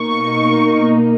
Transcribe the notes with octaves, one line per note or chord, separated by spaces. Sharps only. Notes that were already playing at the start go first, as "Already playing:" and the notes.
Already playing: B2 A#3 D#4 C#6